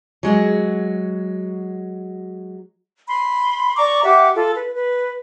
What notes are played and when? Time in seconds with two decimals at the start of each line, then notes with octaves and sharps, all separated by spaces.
0.23 F#3 G#3 F#4
3.08 B5 C6
3.76 D5 A#5 C#6 D6
4.04 G4 E5 F#5 D6
4.35 F4 A4
4.57 B4
4.75 B4